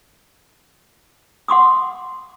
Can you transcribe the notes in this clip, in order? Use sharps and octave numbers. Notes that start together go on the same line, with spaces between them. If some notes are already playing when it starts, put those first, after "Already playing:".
F#5 C6 D6 D#6